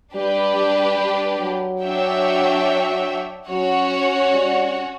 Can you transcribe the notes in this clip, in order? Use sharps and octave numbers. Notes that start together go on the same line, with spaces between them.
G3 D4 G4 B4
G3
G3
F#3
D4 F#4 C#5 E5 G5
F#3 C#4 F#4 C#5 F#5
G3